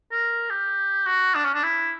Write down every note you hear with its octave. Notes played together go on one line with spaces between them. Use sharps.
A#4
G4
F#4
D4
C#4
D4
E4